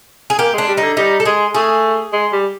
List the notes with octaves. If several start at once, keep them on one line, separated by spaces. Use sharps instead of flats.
G#4
A#3 G4
G#3 D4
G3
D3 D#4
G3 D#4
A4
G#3 G#4
A3 G#4
G#3
G3